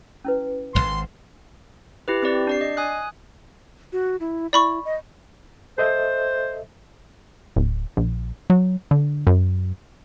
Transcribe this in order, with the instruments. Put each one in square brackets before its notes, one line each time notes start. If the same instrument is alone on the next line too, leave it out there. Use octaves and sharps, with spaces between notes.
[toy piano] C#4 E4 B4
[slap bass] D1 G#1 [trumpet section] C6
[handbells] E4 G4 B4
C4 G4 D5
D4 D5 C7
D#5
G#5 D#6 F#6
[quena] F#4
E4
[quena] E4 [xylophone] D5 B5 C#6
[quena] D#5
[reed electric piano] A4 D#5 E5 [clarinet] C5
[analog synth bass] D1
A#1
F#3
D3
F#2